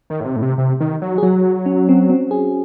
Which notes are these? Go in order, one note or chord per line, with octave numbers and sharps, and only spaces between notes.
D#3
A2
C3
A2
C3
C3
D#3
F#3
G#4
F#3 F#4
C#4
C4
C4
G#4